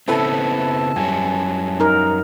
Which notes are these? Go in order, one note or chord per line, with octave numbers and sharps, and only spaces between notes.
C#3 B3 C4 E4 A4 B4 A5
F#2 G3 C#4 G#5
D#4 A#4